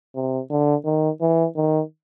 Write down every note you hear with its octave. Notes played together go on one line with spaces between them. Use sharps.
C3
D3
D#3
E3
D#3